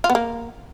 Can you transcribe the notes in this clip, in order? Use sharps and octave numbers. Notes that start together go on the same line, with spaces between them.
F4
B3
A#3